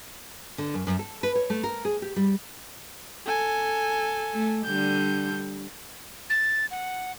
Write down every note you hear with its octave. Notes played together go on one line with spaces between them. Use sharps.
D3
F#2
F#2
A4
B4
C#5
A3
A#4
G#4
G4
G3
A4 G#5
A3
D3 G3 G6
A6
F#5